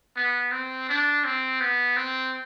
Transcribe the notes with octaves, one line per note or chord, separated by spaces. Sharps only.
B3
C4
D4
C4
B3
C4